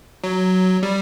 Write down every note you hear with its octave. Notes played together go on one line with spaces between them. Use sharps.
F#3
G3